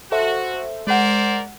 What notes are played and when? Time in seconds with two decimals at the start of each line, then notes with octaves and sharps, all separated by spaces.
0.12 F#4 A4 C5 E5
0.87 G#3 A#4 C5 D5 F#5